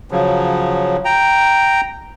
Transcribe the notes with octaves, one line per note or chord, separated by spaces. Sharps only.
C#3 F3 F#3
G5 A#5